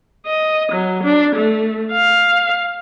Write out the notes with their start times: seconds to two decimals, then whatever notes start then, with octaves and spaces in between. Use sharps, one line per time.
0.26 D#5
0.72 F#3
1.03 D4
1.36 A3
1.92 F5